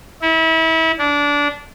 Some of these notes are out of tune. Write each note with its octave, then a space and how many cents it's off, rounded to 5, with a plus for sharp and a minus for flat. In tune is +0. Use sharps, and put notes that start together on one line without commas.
E4 -30
D4 -20